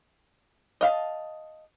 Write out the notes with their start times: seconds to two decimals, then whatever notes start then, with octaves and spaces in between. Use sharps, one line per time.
0.81 D#5 F5 A5